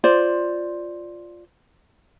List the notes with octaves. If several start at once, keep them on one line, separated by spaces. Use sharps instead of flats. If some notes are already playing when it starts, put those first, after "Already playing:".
F4 C5 D5